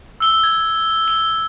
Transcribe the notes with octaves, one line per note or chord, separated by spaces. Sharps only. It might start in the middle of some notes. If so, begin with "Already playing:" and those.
E6 G7
G#6
G7